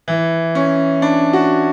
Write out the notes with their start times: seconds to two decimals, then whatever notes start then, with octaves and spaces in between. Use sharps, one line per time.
0.08 E3
0.55 C#4
1.02 D4
1.33 F#4